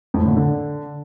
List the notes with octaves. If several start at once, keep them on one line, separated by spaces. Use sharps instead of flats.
F2
A2
D3
A#2
D3